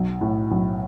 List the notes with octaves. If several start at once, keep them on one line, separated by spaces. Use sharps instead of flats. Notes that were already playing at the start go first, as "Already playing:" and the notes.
Already playing: B1
A2
B1